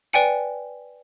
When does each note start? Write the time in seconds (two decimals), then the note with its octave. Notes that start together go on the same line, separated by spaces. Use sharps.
0.13 B4 D5 G5 G#5 C#7